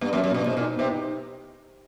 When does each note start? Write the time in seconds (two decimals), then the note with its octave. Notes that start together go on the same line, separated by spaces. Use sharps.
0.01 G2 B3
0.13 F#2
0.16 F#3
0.24 F#2
0.31 G2 B2
0.46 G#2 B2
0.57 A#2
0.61 D#4
0.76 C3 B3
0.90 D#4